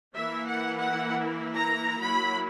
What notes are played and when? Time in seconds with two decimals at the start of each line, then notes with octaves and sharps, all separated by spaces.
0.16 E3 A#3 E4 E5
0.47 F#5
0.79 F#5
1.56 A#5
2.01 F#3 A#3 E4 B5